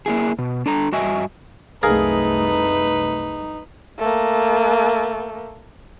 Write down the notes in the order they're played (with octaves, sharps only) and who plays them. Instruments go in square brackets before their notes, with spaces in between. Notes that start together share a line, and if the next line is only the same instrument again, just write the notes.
[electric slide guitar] A#3 E4 G#4
B2
D4 A4 A#5
G2 F#4 D#5 E5 G#5
[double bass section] C2 F#2 A3 [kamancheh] D#4 [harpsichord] G#4 A#4 F5 [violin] B4
[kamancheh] A3 A#3